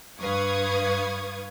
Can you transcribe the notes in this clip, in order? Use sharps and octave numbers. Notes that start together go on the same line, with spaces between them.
G2 B4 F5 C#6 D#6 G#6